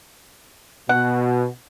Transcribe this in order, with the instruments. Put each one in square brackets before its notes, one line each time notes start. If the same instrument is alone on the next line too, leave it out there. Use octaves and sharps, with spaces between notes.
[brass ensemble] B2 [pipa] F#5